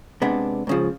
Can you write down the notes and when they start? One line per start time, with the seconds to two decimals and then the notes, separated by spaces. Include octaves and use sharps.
0.22 C3 G#3 B3 D4
0.67 G#2 C#3 F3